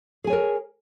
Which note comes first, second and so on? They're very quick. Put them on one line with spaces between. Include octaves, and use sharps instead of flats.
G#4 G#5 C#5 A#4